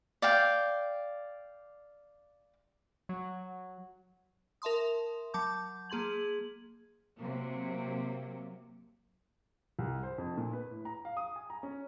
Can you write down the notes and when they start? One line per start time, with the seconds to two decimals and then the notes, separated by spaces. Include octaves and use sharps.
0.22 D5 F5 G5
3.09 F#3
4.62 A#4 E5 A5 C6 D#6
5.34 F#3 A5 D6 G6
5.90 A#3 G#4 C6 G#6 F#7
7.18 C3 F#3 A#3
9.79 C2
10.03 C5
10.18 F2
10.37 A#2
10.53 B4
10.71 A2
10.85 A#5
11.05 F5
11.17 D#6
11.36 G#5
11.50 A#5
11.63 C#4